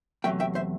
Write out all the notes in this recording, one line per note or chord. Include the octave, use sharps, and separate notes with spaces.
E2 C3 F#3 A3 E5 G5
E5 G5
C5 E5